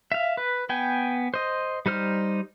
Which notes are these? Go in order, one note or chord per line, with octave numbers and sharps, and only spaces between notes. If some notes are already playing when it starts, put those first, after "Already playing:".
E5 F5
B4
B3 G5 G#5
C5 D#5
G3 D#4 C5 F6